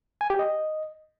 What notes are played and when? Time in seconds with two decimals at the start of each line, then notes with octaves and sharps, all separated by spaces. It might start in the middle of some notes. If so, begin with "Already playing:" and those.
0.21 G#5
0.30 G4
0.39 D#5